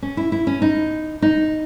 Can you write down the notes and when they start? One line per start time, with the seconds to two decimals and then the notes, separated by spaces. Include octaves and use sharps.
0.02 C#4
0.17 E4
0.32 E4
0.47 C#4
0.62 D#4
1.22 D#4